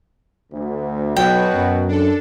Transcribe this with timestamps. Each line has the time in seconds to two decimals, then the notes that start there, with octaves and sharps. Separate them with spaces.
0.52 D2
1.16 B1 B2 F#3 F#4 B4 G5
1.54 F#2
1.88 D4 A4